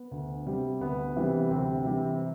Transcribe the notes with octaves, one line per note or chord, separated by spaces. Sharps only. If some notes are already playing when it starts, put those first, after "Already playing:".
Already playing: B3
D2
C3 G3
D2 B3
C3 E3 G3
D2 C3 C4
C3 E3 G3